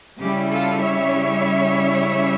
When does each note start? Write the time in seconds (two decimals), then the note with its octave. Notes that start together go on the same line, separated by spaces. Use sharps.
0.20 C#3 G3 C#4 E4 G4
0.50 F4 A4
0.81 C#5 E5